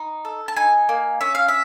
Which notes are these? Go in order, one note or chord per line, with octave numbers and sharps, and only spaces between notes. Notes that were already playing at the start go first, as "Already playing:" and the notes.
Already playing: D#4
A4
A5
D#4 G#5
A#3
C#4 E5
F5
E5